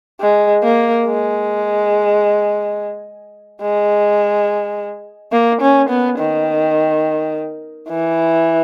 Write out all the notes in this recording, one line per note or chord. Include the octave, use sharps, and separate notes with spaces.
G#3
A#3
G#3
G#3
A#3
C#4
B3
D#3
E3